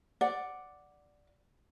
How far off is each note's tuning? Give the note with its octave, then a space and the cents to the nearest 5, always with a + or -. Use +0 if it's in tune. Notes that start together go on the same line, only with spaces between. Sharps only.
D5 +0 F#5 +0